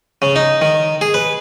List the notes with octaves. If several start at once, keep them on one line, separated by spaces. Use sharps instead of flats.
C#3
D#4
D#3
G#4
B4